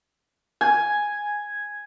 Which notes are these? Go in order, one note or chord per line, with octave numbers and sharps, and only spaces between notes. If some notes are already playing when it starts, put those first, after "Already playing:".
G#5